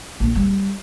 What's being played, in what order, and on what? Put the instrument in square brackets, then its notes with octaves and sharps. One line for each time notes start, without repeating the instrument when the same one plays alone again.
[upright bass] A#1
G3